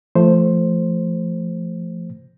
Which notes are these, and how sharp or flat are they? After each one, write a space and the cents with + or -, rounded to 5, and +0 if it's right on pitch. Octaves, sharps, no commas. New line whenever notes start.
F3 -25 A3 +0 C5 +5